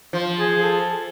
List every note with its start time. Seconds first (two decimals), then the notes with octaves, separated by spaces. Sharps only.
0.13 F3
0.40 G#4
0.63 A4